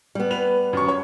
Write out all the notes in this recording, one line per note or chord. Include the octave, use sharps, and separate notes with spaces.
G3 B3
B4 F7
F#2 C#6
C#5